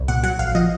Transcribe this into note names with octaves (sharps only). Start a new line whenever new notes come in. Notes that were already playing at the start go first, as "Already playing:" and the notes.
Already playing: C2
A#2 F#5
F#3 F#5
A1 F5
F3 D#5